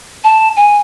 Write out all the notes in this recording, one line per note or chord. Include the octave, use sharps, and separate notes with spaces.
A5
G#5